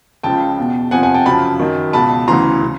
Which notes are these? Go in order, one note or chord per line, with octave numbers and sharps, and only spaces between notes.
C#2 C#3 F3 G5 A5
E2 B2
F2 C3 F3 F#5 G#5
F#5 G#5
G5 A5
F#2 C#3 F3 A5 B5
F#2 D#3
C#2 B2 A5 B5
D2 C#3 E3 A#5 C6
C#3